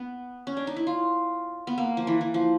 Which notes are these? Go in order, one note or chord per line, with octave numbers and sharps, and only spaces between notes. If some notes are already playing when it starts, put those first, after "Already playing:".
Already playing: B3
C#4
D4
D#4
E4
F4
B3
A#3
F3
E3
E3
F3